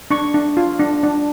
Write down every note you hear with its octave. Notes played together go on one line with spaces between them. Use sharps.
D4 C#6
D4
F4
D4
D4